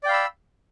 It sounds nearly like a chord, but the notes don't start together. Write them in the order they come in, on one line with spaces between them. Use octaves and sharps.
D5 G5 F5 B5 E6